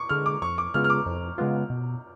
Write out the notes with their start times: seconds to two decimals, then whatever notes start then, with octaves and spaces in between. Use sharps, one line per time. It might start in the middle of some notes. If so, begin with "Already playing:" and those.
Already playing: C#6 D6
0.09 D3 G#3 F6
0.26 D6
0.42 F2 C#6
0.58 D6
0.74 C#3 G#3 B3 F4 F6
0.84 F6
0.90 D6
1.06 F2
1.38 C#3 G#3 B3 F4
1.70 B2